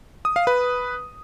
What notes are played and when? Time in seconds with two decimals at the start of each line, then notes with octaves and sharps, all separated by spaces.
0.25 D#6
0.36 F5
0.47 B4